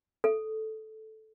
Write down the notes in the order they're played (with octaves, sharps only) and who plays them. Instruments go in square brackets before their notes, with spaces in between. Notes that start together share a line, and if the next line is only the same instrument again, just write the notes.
[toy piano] A4